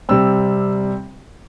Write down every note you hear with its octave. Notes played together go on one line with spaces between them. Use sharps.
C3 G3 C4 E6